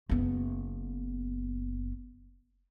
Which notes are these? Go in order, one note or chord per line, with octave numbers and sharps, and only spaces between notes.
F#1 B3